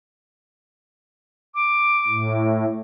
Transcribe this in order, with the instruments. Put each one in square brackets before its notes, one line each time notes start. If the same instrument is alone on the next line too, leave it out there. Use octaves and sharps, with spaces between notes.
[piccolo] D6
[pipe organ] A2